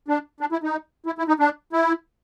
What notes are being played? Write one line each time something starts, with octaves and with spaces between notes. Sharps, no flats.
D4
D4
E4
D#4
E4
E4
D#4
D4
E4